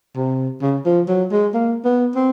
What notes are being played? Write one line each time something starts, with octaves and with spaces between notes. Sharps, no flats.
C3
C#3
F3
F#3
G#3
A#3
B3
C4